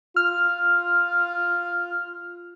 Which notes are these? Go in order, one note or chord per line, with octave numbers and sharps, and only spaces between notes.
F4 F6